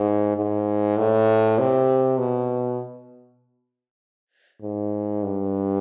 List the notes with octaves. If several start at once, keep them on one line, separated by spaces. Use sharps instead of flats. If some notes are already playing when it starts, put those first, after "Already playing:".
Already playing: G#2
G#2
A2
C3
B2
G#2
G2